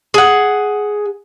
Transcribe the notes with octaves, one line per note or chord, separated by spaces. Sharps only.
G#4 F#5